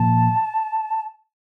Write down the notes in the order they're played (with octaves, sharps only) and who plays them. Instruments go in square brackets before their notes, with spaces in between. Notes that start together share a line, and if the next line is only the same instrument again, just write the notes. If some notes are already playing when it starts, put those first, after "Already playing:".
Already playing: [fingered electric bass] A#2 F3 A#3 [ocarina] A5